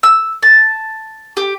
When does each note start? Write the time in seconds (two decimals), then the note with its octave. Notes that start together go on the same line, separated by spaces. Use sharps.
0.03 E6
0.43 A5
1.37 G4